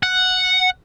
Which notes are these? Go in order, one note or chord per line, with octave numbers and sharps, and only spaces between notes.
F#5